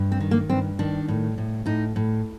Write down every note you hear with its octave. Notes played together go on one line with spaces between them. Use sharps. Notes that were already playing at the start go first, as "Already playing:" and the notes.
Already playing: G2
C4
D#3
A#3
G2 C4
D#3 D4
A2
A2
A2 D#4
A2